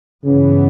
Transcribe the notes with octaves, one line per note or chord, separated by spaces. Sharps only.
G2 C#3 E3 B3